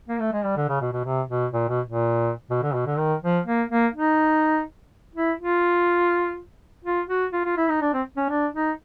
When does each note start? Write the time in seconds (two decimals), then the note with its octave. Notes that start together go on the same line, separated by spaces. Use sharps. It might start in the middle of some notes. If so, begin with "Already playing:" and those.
0.08 A#3
0.20 A3
0.33 G#3
0.44 G3
0.57 D3
0.69 C#3
0.81 B2
0.92 B2
1.05 C3
1.29 B2
1.53 A#2
1.69 B2
1.86 A#2
2.50 B2
2.63 D3
2.74 B2
2.86 D3
2.98 D#3
3.23 F3
3.46 A#3
3.70 A#3
3.95 D#4
5.15 E4
5.39 F4
6.84 F4
7.08 F#4
7.33 F4
7.45 F4
7.57 E4
7.69 D#4
7.82 D4
7.94 C4
8.17 C#4
8.29 D4
8.54 D#4